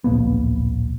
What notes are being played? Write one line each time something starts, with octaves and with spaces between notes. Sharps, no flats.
D1 A#1 A#3 B3